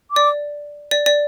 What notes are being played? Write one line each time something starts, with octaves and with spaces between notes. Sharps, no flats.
D6
D5
D5
D5